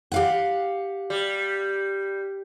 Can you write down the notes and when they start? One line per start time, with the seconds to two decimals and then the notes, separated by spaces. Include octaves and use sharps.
0.12 G4 F5 F#5
1.10 G3